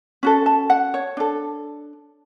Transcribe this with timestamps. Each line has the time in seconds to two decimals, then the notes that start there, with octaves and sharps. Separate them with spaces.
0.23 C#4 F#4 A4
0.46 A5
0.70 F#5
0.94 C#5
1.17 D4 A4